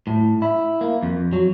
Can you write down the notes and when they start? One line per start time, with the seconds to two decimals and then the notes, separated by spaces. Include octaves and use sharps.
0.07 A2
0.42 E4
0.81 A#3
1.03 F2
1.33 F#3